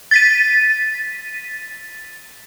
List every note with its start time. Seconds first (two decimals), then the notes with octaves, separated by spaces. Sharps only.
0.11 A6 B6 D#7